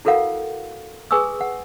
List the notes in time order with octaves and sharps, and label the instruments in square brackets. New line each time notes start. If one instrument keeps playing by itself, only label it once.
[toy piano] E4 F#4 A4 A#4 F5 F#5
G#4 B4 G#5 C#6 D#6 E6
F#5